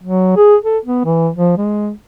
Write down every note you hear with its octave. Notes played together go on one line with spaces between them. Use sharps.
F#3
G#4
A4
B3
E3
F3
G#3